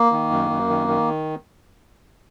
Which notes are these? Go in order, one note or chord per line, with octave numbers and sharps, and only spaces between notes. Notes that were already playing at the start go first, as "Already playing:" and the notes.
Already playing: A#3
D#3
F#2
F#2
D#3
D#3